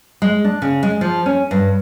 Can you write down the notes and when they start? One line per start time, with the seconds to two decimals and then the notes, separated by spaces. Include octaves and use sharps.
0.22 G#3
0.44 D4
0.62 C#3
0.83 G#3
1.01 F3
1.26 C#4
1.51 G2